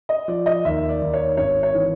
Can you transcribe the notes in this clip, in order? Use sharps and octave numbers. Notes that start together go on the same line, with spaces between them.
D#5
F3 D5
D#5
D#2 E5
D5
D#2
C#5
G#1 C#5
C#5
E3